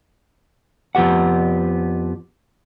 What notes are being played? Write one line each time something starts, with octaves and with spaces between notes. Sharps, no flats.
F2 F3 B3 G4 F#5